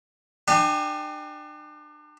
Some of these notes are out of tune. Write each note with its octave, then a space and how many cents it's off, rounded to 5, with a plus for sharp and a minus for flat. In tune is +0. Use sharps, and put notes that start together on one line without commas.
D4 +35 G4 +0 G#5 +0